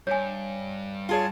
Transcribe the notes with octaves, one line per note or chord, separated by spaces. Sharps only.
G2 C#5 G#5
F4 G#4 C#5 A5